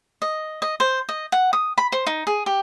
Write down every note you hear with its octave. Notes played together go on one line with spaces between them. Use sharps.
D#5
D#5
C5
D#5
F#5
D#6
B5
C5
D#4
G#4
G4